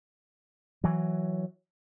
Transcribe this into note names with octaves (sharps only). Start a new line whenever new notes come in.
E3 F#3